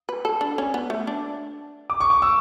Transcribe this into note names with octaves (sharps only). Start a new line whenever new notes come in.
B4
A4
D4
C#4
B3
A3
D4
D6
C#6
D6
E6